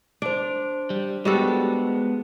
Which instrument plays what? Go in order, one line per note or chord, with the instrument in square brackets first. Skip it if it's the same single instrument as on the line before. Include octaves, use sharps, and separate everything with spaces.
[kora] D4 [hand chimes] C5 D7
[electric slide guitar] G3
[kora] G3 F#4 A4 [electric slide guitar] G#3 B3